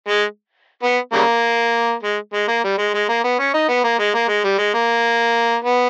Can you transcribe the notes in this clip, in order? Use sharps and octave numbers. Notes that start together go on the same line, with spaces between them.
G#3
B3
C#3 G3 A#3
G#3
G#3
A#3
G3
G#3
G#3
A#3
B3
C#4
D#4
B3
A#3
G#3
A#3
G#3
G3
G#3
A#3
B3